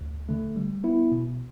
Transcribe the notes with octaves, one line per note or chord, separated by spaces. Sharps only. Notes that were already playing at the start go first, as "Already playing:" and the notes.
D2
D3 A3
G3
B3 E4
B2